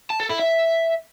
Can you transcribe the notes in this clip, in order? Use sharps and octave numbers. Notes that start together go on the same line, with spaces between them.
A5
A4
E4
E5